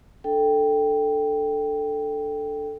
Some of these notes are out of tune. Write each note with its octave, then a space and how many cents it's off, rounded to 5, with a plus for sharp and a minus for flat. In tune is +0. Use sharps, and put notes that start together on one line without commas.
D4 +0 A4 +0 G5 +0